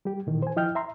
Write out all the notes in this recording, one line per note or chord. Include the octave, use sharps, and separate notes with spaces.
G3 G4
A#2 D#3 E3
C5 G#5
F3 E4 D#5 G5 F6 G6
E5 A#5 C6